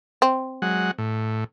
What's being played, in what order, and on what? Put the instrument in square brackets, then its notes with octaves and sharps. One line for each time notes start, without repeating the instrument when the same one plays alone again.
[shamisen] C4
[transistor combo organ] F#3 G#3 F#5
A2